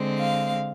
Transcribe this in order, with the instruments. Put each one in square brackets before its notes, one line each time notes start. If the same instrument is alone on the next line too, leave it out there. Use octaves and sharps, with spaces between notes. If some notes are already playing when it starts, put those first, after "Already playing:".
Already playing: [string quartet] D3 G#3 C4
F5